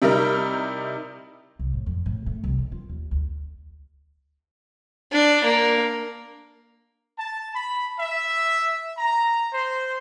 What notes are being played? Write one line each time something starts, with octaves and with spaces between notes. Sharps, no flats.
C3 G3 D#4 E4 A#4
C2
A2
F2
A2
A3
C2
D#3
F4
D#2
D2
D4
A#3
A5
B5
E5
A#5
C5